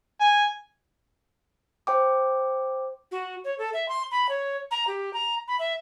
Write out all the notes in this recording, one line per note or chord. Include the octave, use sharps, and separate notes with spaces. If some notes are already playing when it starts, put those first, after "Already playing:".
G#5
C5 G5 D6
F#4
C#5
A4
E5
C6
B5
C#5
A#5
G4
A#5
B5
E5